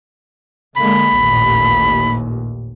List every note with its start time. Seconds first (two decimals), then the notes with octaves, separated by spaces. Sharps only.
0.76 D3 G#3 A#3 B5
1.16 A1 D#2 A#2